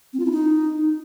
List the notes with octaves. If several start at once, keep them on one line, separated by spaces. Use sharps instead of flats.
C4
F4
E4
D#4